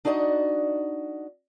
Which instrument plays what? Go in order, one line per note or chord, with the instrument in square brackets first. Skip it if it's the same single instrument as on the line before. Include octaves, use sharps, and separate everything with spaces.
[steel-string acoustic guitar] D4 D#4 F#4 D5 D#5